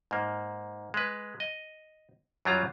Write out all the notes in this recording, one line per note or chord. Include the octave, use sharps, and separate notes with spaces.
G#2 A#3
G#3 B4
D#5
F#2 F#3 G3 F4 A#5